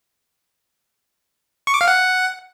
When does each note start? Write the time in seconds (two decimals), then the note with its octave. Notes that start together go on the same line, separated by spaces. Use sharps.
1.67 C#6
1.74 D6
1.81 F5
1.88 F#5